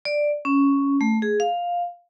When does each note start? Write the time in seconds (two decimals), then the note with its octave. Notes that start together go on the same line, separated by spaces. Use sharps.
0.05 D5
0.45 C#4
1.01 A3
1.22 G#4
1.40 F5